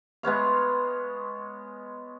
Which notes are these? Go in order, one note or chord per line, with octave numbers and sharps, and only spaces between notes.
G#3 B3 C#5 F5